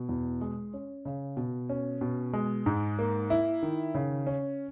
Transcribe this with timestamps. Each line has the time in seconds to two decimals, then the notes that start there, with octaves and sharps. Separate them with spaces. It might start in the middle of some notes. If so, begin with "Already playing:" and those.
Already playing: B2
0.09 E2
0.41 G#3
0.74 C#4
1.05 C#3
1.37 B2
1.69 C#4
2.01 B2
2.33 G#3
2.66 G#2
2.99 A#3
3.30 E4
3.63 D#3
3.94 C#3
4.27 C#4